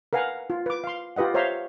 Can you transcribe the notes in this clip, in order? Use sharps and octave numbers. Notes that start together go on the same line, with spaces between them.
A#4 B4 F5 F#5 G#5 A#5
F4
B4 D6
F5 C6
F4 G4 B4 D#5 F#5
C5 C#5 E5 F5 A#5 C6